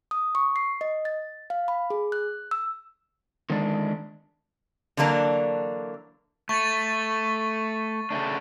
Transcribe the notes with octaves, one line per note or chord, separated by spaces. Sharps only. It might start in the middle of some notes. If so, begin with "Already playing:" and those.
D#6
C#6
C7
D#5
A6
F5
B5
G#4
F#6
E6
D3 D#3 G#3 D4
D3 E3 F#3 A#3 D4
A3 C#6 A6
C#3 A3 D4